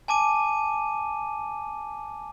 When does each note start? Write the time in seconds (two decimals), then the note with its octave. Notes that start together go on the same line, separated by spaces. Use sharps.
0.08 G#5 A5 D6 D#7